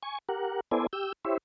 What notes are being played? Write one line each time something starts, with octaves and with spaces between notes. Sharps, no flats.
G#5 C#6
G4 A#4 F#5
B3 E4 A4 C5 D5 G#5
G4 E6 G6
E4 G4 C5 C#5 E5